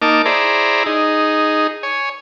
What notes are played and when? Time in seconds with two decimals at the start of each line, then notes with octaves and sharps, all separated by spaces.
0.02 A#3 D#4 A5 D6
0.25 E4 G#4 C5 D5 A#5
0.86 D#4 G#4
1.83 C#5 G#5